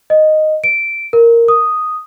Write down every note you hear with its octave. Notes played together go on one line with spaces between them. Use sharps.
D#5
D7
A#4
D#6